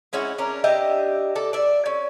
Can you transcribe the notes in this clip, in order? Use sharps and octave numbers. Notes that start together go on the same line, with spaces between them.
G#3 C#4 E4 F#4
C#4 D4 A#4
D4 G4 D#5 E5
A4 D5
D5 E5
C#4